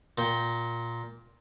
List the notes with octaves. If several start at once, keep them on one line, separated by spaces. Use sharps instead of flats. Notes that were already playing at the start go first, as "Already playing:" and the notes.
A#2 G5